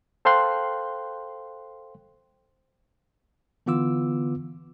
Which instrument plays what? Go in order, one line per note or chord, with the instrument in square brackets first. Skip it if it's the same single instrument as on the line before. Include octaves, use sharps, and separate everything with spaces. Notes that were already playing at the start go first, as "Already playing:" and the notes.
[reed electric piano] A4 C5 F5 G5 C6 F#6
[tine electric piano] D3 E3 B3 F4 D6 E6